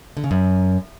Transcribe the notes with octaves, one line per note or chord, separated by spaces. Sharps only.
D3
C#3
F#2